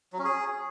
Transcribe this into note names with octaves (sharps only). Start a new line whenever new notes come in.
F#3
C#4
G#4